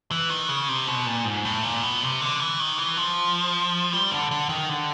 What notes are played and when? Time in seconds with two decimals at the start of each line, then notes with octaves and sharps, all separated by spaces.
0.11 E3
0.30 D#3
0.49 C#3
0.69 C3
0.87 B2
1.07 A#2
1.25 G#2
1.45 A2
1.63 A#2
1.83 B2
2.02 C3
2.21 D3
2.40 E3
2.60 D#3
2.78 E3
2.97 F3
3.93 G3
4.11 D3
4.31 D3
4.49 D#3
4.69 D3